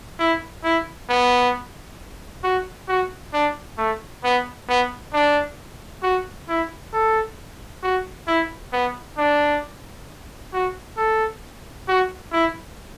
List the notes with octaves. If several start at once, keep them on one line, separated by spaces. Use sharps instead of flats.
E4
E4
B3
F#4
F#4
D4
A3
B3
B3
D4
F#4
E4
A4
F#4
E4
B3
D4
F#4
A4
F#4
E4